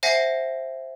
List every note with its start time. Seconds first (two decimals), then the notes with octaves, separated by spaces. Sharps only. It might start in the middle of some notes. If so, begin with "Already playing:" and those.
0.03 C5 E5 F#5 G#5 A#6 C7